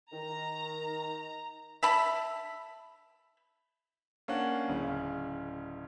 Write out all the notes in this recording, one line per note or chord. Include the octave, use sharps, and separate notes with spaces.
D#3 A#5
E5 A5 B5
A#3 C#4 D4 F#5
D1 C#3